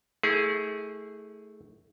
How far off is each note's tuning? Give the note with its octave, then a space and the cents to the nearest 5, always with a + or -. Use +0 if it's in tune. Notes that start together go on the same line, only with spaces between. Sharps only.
A3 +0 E4 -40 G#4 +0